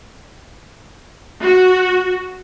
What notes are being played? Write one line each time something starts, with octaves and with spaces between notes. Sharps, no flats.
F#4